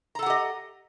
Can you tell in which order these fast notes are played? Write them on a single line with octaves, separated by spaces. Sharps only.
A#5 A4 F#5 G4 D#5